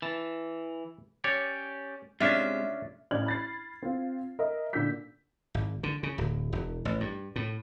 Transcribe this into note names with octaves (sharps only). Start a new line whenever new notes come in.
E3 A5
C#4 G4 C#5 D5
C3 G#3 C#4 D4 F4 E5
A1 D5 F6 G#6 F#7
B5 A6 C7
C4 F4
A#4 D#5 E5
A#2 D3 D4 E6 G6 B6
G#1
D3
C#3
D1
E1
A1
G2
A2